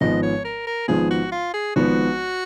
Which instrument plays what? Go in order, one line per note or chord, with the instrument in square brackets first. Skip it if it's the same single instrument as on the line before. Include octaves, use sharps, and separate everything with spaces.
[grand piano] G#1 G#2 F3 B3 [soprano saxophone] D#5
[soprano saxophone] C#5
A#4
A#4
[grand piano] G#1 G#2 F3 B3 [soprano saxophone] G#4
[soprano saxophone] F#4
F4
G#4
[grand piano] G#1 G#2 F3 B3 [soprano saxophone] F#4